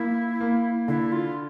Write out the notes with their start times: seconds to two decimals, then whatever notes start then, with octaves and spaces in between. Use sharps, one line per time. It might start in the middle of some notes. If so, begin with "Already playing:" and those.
Already playing: A#3 E4
0.40 A#3
0.88 D3 E4
1.12 F4